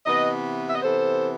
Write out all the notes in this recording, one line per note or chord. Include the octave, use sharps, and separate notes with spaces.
C3 E3 B3 B4 D#5
E5
D#5
C3 E3 B3 A4 C5